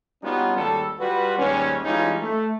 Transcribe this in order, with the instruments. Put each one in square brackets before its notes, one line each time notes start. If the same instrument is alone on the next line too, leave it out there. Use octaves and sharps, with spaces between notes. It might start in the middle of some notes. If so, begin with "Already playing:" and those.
[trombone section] G3 B3 C#4 D#4 F4 F#4
G#1 D#2 G3 A4
G3 F4 F#4 B4
D#2 G#2 G3 C#4
E3 G3 G#3 C#4 D#4 F4
A3